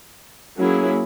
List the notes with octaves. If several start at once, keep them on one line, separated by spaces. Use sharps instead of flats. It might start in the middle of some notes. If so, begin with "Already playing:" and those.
F#3 A#3 C#4 E4 G#4